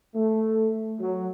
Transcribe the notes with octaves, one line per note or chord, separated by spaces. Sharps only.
A3
F#3